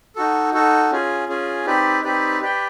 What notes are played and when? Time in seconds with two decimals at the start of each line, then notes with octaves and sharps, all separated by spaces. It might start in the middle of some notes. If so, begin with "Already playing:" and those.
0.16 D#4 F#4 A4
0.53 D#4 F#4 A4
0.91 C#4 F4 G#4
1.29 C#4 F4 G#4
1.66 C4 D#4 G4 B4 D5
2.04 C4 D#4 G4 B4 D5
2.41 G4 B4 D5 G5